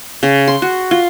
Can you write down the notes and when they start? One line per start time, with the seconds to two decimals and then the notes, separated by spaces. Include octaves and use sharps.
0.23 C#3
0.48 C6
0.62 F#4
0.91 F4